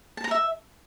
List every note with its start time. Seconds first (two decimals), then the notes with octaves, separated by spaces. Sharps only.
0.17 A5
0.24 A#5
0.31 E5